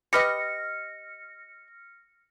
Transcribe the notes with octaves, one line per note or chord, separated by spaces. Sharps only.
G4 B4 D#5 F6 A#6 C#7